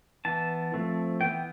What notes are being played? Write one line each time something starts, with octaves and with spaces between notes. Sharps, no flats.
E3 B3 A5
F3 A3 C4
E3 B3 G5